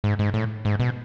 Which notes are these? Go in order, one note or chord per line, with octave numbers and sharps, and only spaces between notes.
G#2
G#2
A2
G#2
B2